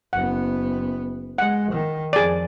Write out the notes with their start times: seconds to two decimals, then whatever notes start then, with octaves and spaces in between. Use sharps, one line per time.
0.13 F#1 B3 F#5
1.38 G#3 F#5
1.71 D#3
2.13 F2 G#4 D5